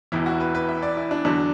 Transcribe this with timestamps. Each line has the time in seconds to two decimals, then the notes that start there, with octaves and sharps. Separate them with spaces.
0.12 E1 E2 E3 E4
0.26 F#4
0.40 B4
0.55 B4
0.68 E5
0.83 D5
0.97 E4
1.11 D4
1.25 E2 D3 F#3 D4